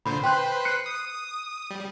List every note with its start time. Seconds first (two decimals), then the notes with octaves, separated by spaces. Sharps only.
0.05 A#2 D3 C5 B5
0.24 B4 C5 G5 C6 F#6
0.65 F#6 C7 C#7
0.86 D#6
1.71 G3